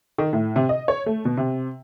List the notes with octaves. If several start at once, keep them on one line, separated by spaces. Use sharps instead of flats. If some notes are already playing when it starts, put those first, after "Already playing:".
D#3
A2
C3
D#5
C#5
A3
B2
C3